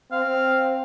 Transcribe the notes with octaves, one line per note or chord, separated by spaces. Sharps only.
C4 F5